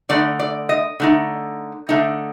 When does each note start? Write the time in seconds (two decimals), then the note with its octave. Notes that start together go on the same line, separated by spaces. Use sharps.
0.09 D3 A3 D#4 D5
0.39 D5
0.69 D#5
1.00 D3 A3 D#4
1.89 D3 A3 D#4